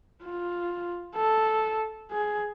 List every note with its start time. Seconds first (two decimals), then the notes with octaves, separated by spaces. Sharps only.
0.24 F4
1.15 A4
2.12 G#4